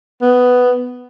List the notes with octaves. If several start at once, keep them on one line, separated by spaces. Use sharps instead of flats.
B3